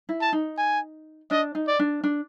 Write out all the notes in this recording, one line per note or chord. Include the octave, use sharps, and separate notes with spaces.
E4
A5
D#4
G#5
D4 D#5
D#4
D5
D4
D4